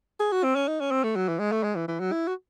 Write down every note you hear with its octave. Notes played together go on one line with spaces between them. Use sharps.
G#4
F#4
C4
C#4
D#4
C#4
C4
A3
F#3
E3
G#3
A3
G#3
E3
E3
F#3
E4
F#4